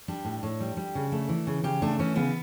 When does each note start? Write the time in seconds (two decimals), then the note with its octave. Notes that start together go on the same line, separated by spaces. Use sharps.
0.08 G3 D4
0.25 A2
0.43 A2
0.60 G3
0.77 G3
0.95 C#3
1.12 A3
1.29 E3
1.47 C#3
1.63 C#3 G4
1.82 A3 D4
1.99 E3 C#4
2.15 C#3 B3